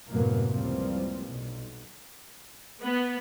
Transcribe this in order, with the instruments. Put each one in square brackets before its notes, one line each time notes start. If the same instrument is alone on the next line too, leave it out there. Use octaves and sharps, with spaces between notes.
[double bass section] F#2 A2 C3 F#3 A#3 B3
C#2 E3 F3 G3 A#3 C4
B1
[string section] B3